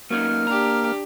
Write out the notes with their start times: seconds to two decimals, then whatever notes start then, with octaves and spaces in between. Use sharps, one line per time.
0.10 F#3 A#3 C#4 D#4 F6
0.47 D4 G4 A#5